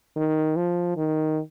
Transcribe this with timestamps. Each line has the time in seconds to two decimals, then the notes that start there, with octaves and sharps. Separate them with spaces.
0.16 D#3
0.56 F3
0.96 D#3